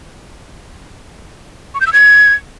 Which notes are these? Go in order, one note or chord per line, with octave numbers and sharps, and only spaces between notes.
C#6
G6
E6
G#6